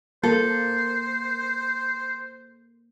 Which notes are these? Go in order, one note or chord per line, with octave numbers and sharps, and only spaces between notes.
A#3 A4 C5